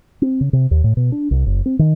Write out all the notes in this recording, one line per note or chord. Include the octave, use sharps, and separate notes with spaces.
C4
C#3
C3
D#2
A2
B2
D4
C2
F#1
C4
D#3